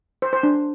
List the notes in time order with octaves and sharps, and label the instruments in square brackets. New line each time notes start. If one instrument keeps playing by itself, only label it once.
[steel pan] C5
C5
D4